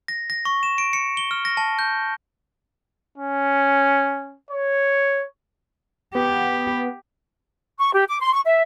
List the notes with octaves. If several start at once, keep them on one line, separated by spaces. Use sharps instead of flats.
A#6
A#6
C#6
E7
D7
C#7
G7
F6
A#6
A5
G6
C#4
C#5
B3 G4
C#6
G4
D6
C6
C#6
E5